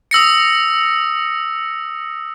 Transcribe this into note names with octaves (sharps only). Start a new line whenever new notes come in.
D#6 E6 A#6 C#7